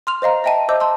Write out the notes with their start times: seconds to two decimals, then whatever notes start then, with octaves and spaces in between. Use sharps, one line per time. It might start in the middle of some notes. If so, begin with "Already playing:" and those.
0.07 C6 F6 F7
0.22 C5 D#5 F5 A#5
0.44 D#5 E5 G5 A5 D#7
0.69 C5 D#5 D6 E6 G6
0.80 A5 C6 E6